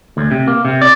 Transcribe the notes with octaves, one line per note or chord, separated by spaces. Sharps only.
D2
C3
A#3
C3
D5